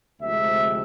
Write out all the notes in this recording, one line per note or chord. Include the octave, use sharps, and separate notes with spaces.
D2 C3 F3 G#3 E5